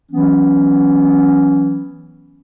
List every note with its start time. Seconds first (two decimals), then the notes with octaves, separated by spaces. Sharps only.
0.11 E3 F#3 B3 C#4